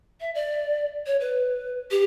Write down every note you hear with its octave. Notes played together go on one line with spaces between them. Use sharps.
E5
D5
C#5
B4
G4